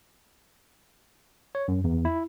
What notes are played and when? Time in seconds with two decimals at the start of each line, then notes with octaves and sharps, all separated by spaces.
1.55 C#5
1.68 F#2
1.84 E2
2.05 E4